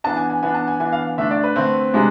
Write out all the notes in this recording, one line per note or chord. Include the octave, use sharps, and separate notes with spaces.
E3 B3 D4 A5
G#5
G#5
E3 B3 D4 G#5
A5
G#5
E3 B3 D4 G#5
F5
D3 A3 D4 E5
D5
B4
D3 A3 C4
C3 G#3 D4